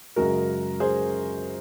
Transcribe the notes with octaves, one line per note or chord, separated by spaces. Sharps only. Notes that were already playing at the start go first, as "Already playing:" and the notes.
F#2 C#3 G#3 F#4 A#4
G#4 C5